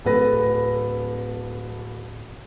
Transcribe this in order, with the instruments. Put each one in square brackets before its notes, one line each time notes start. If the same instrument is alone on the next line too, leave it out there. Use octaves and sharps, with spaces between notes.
[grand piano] D1 A4 B4 A#6